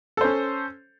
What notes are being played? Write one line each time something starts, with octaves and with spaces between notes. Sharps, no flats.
C#4 A4 C5